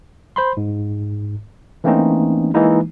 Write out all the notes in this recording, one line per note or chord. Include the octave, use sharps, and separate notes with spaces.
C5 B5 C6
G#2
E3 A3 A#3 C4 C#4 D#4
E3 G#3 A#3 D#4 E4